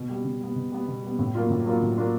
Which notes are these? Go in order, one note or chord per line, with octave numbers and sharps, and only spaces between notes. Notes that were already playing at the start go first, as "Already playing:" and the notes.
Already playing: B2
G3 B3
B2
G3 B3
B2
G3 B3
B2
G3 B3
A2
F#3 A#3 D4 F4
A2
F#3 A#3 D4 F4
A2
F#3 A#3 D4 F4